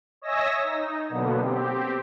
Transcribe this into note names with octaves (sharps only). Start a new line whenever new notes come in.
C#5 D#5 E5 G#5 E6 A#6
D#4
B2 D3 F#3 A#3 B3
C4 G4